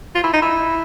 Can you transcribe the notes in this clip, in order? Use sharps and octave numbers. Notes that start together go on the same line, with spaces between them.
F4
E4
D#4
E4